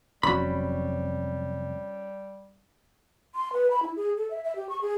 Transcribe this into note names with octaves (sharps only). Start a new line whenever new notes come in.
F1 F2 F#3 G3 C#4 E4 F#4 B5
C6
B4
B5
E4
G#4
A4
E5
E5
G4
C#6
G#4